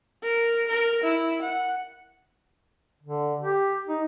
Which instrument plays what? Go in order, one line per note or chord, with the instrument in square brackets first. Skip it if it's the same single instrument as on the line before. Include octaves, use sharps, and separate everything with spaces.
[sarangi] A#4
A#4
E4
F#5
[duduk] D3
G4
D#4